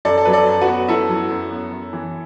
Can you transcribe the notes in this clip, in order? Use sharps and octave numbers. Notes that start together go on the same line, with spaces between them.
F#2 A4 D5
A4
F#3 B4
A4 D5
F#2
F#4 B4
B3
F#2 E4 A4
F#3
F#2
B3
F#2
E3